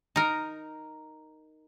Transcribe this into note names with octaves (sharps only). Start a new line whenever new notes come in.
D#4 A#4